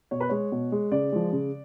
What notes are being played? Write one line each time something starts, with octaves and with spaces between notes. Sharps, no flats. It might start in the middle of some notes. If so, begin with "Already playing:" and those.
B2 C#5
B4
G#3 C#5
B2
G#3
C#3 D5
F3 G#3
C#3